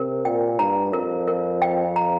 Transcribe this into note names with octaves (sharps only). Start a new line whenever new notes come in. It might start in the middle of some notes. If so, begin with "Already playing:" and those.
Already playing: C3 A#4
A#2 G5
G2 A#5
F2 A#4
A#4
G5
A#5